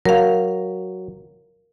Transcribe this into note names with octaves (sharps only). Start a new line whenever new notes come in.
F#3 A#4 F5